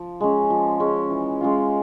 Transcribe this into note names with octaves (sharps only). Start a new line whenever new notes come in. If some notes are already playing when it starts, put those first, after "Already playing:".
Already playing: F3
G#3 C#4
F3
G#3 C#4
E3
G#3 C#4 F4